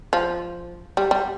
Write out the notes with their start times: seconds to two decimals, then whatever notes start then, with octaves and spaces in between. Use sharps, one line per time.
0.13 F3
0.97 G3
1.11 G3